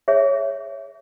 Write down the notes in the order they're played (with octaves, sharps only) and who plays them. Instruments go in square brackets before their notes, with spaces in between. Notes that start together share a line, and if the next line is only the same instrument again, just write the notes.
[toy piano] G#4 C#5 E5